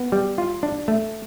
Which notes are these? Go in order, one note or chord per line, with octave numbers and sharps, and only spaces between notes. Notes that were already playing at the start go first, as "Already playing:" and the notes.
Already playing: B3
G3
F4
D4
A3